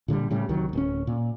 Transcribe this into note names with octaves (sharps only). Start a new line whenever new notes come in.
A#2 D3 E3 G3
A2 C#3 G3
C2 D#3 F#3
D1 C#4
A#2